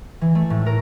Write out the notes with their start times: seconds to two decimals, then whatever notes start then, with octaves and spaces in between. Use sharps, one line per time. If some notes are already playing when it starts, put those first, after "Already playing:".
0.21 E3
0.35 A3
0.50 A2
0.66 A#4